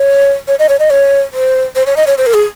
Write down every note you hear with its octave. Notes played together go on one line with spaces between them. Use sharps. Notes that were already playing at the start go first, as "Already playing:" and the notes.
Already playing: C#5
C#5
D#5
C#5
D#5
C#5
C5
C5
C#5
D#5
C#5
C5
A#4
G#4